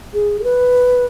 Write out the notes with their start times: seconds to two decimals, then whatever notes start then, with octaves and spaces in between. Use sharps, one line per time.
0.14 G#4
0.40 A4
0.44 B4